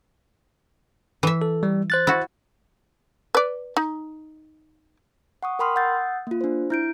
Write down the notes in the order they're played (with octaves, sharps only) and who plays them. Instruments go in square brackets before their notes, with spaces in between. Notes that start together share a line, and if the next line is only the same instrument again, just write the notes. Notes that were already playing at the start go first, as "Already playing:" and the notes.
[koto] E3 E5
[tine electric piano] A4
G3
C5 F#6 A6
[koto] E4 F#4
[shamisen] B4 D5
D#4
[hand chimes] F#5 C#6 D#6
A#4 G5 B5 C6 D#6 F6
F#5 D#6 E6 F#6 G6 A6
A#3 F4
D4 C5
E4 G6 D7